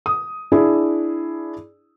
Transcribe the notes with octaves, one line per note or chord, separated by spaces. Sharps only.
D#6
D4 E4 G#4